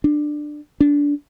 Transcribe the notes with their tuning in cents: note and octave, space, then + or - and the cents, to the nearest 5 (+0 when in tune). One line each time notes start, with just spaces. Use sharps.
D4 +15
D4 -20